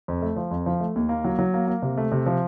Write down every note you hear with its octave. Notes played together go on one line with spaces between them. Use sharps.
F2
A3
F3
F2
F3
A3
D#2
A#3
F#3
F#3
A#3
A#3
C3
A3
C3
F3